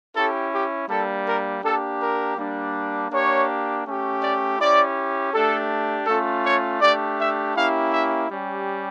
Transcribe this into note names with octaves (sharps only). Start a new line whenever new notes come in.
C#4 E4 G4 A4
G4
G3 A#3 D4 A4
A#4
A#3 D4 G4 A4
A#4
G3 A#3 D4
A#3 D4 G4 C#5
A3 C#4 G4
D5
C#4 E4 G4 D5
A3 D4 G4 A4
A3 C#4 F4 A4
C#5
A3 D4 G4 D5
E5
A#3 C#4 E4 G4 F5
E5
G3 C#4 G4